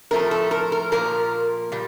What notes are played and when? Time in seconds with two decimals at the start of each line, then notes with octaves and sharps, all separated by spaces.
0.11 A2 F3 A3 C4 A#4
0.31 A4
0.51 A#4
0.72 A#4
0.92 A#2 F3 A#3 A#4
1.72 A#2 G3